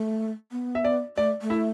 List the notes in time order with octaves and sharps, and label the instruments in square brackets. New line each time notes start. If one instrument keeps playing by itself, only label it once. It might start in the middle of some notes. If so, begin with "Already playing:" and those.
Already playing: [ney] A3
B3
[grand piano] E5
D5
[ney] A3 [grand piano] D5
[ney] A3
[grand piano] E4 E5